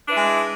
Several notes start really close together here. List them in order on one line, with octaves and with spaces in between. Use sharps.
D4 B4 E4 G#3